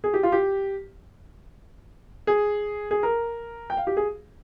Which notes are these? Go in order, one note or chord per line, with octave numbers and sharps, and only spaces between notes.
G#4
G4
F4
G4
G#4
G#4
A#4
G5
F5
G4
G#4